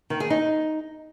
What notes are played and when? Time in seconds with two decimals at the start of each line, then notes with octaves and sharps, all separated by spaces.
0.10 D#3
0.20 G#4
0.30 D#4